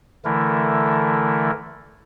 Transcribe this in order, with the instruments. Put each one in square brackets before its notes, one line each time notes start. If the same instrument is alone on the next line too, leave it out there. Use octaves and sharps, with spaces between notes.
[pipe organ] D3 E3 A3 E4 A#4